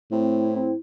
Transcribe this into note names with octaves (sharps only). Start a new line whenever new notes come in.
A2 C4
E4
C4